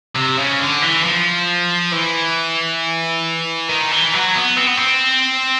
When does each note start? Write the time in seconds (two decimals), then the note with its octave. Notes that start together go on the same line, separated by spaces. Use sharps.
0.16 C3
0.38 C#3
0.60 D3
0.82 E3
1.04 F3
1.93 E3
3.69 D#3
3.92 E3
4.14 F#3
4.36 B3
4.58 C4
4.67 B3
4.77 C4